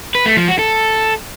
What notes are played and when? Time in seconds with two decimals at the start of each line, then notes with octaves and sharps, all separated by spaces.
0.15 B4
0.26 A3
0.37 F3
0.48 F#4
0.59 A4